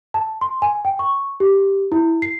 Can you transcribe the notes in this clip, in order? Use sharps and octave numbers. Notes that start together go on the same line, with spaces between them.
A5
C6
G#5
G5
C#6
G4
E4
C7